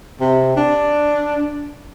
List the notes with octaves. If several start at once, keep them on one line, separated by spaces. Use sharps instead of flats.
C3
D4